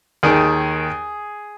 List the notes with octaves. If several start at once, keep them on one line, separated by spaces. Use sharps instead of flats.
D#2 D#3 G#4